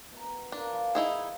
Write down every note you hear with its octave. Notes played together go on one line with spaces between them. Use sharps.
B2 A#5
D4 F4 A#4
F3 F5
D#4 E4 G#4